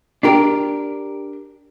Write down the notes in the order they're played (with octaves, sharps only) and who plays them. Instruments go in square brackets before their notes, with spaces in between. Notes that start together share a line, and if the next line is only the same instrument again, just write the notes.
[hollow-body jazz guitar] D4 G4 A#4